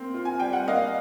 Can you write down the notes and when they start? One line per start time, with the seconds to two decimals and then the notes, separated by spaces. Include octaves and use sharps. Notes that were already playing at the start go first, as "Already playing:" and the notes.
Already playing: A#3 C4
0.14 F4
0.25 G#5
0.39 G3 G5
0.53 F#5
0.67 A#3 D#5 F5